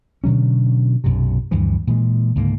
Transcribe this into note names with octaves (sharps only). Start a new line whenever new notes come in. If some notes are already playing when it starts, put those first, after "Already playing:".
B2 D3 F#3 C#4
B1 F#2 C3
D2 G2 E3 F3
A#2 E3 G#3
C#2 G#2 D3 A#3